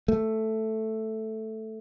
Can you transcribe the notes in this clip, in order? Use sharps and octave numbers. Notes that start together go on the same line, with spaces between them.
A3